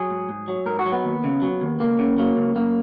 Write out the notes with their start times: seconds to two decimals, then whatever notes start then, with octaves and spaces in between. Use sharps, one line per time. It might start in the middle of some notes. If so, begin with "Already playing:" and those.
Already playing: F#3 G#4
0.10 G#2
0.29 G#2
0.48 F#3
0.66 G#2 A#4
0.79 F#4
0.86 F#3
0.92 B3
1.04 D#2
1.24 C#3
1.42 F#3
1.61 D#2
1.80 C#2 A#3
1.99 C#3
2.18 F#3 A#3
2.37 C#2
2.56 F#2 A#3